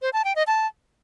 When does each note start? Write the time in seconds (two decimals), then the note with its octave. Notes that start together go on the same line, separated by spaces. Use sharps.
0.02 C5
0.13 A5
0.24 G5
0.36 D#5
0.47 A5